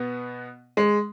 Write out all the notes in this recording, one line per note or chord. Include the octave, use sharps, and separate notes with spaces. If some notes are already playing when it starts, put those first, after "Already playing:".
Already playing: B2 B3
G#3